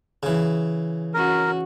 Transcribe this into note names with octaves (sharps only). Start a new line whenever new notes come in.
C#3 E3
C#4 F#4 A#4